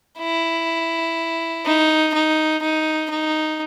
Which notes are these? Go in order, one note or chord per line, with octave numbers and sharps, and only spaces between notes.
E4
D#4
D#4
D#4
D#4